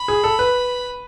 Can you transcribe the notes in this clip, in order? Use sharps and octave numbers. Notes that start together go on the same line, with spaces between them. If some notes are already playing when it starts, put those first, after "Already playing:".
Already playing: B5
G#4
A4
B4